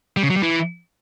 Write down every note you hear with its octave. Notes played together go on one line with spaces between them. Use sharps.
G3
C#3
F#3
G3
E3